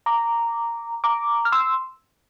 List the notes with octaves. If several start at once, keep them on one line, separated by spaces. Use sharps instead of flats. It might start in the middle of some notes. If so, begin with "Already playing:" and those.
A#5 D6
A#5 D6
F6
C6 E6